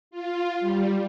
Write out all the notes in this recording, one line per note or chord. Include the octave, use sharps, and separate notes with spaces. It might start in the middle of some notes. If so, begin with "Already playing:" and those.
F4
G3